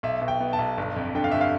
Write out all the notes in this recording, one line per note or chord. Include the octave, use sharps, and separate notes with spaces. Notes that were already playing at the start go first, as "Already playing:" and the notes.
B1 E5
B2
G5
B3
A5
B1
G1
F2
D3 G5
F5
G1 E5
F5